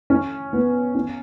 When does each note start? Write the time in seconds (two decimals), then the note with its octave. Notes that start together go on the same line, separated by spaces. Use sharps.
0.10 C#4
0.53 B3
0.95 C#4